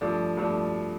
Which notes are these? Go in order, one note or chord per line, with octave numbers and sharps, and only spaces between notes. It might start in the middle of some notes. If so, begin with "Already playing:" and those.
G2 F3 A3 D4
G2 F3 A3 D4